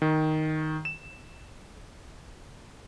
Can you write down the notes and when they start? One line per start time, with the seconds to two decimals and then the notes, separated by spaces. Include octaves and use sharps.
0.02 D#3
0.85 E7